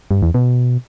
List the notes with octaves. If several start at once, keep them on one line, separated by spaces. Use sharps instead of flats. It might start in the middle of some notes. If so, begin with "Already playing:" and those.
G2
E2
B2